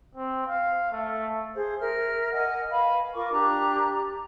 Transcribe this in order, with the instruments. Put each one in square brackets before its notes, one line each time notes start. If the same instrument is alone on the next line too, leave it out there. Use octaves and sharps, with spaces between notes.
[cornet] C4
F5
A3
[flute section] G#4 C5
A#4 E5 F6
D#5 F#5 G#5 F6
B4 F5 G#5 B5
F4 A#4 C#6 D6
D4 G4 A#5 F#6